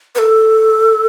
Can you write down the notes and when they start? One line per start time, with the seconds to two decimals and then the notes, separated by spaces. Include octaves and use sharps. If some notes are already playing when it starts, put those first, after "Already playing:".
0.15 B4
0.19 A4